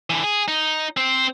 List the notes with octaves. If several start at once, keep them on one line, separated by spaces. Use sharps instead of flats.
D3 E3
G#4
D#4
C4 C5